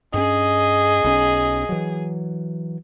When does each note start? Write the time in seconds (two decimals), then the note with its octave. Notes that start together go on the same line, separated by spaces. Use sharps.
0.14 G2 C#4 G#4 D#5
1.04 B1 C#4
1.69 E3 F#3